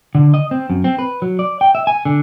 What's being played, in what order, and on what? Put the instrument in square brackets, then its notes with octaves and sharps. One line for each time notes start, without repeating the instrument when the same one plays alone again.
[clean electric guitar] D3
D#5
C4
F#2
C4
B4
F#3
D5
G5
E5
G#5
D3